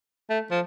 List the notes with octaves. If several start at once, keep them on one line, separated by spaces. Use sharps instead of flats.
A3
F3